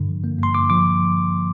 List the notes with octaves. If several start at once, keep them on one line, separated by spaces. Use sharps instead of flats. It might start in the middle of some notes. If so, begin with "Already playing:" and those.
Already playing: G2 D3
F3
A#3
G2 C6
G2 D6
F3 D6